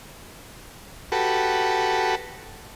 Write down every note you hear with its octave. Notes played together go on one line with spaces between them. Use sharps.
F#4 G4 A4 B4